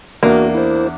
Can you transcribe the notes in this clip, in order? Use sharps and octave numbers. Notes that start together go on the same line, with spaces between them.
E2 A#3 D4 F#4 A#4
E4 C5